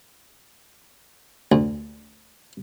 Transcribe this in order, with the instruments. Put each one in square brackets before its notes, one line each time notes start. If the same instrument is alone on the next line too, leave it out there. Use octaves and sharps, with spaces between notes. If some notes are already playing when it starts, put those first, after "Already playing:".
[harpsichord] D2